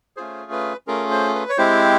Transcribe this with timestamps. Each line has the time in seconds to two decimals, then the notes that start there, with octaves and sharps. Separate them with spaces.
0.17 A3 C#4 F4 G#4 C5
0.52 B4
0.87 A3 C#4 F4 G#4 A#4
1.11 C5
1.35 B4
1.49 C#5
1.58 G#3 C4 E4 G4 C5